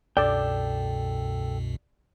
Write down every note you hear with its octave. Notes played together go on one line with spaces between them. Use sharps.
C2 F#2 B2 A4 D5 G5